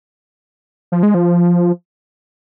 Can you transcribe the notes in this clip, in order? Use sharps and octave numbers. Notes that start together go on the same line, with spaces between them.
F3
G#3
F3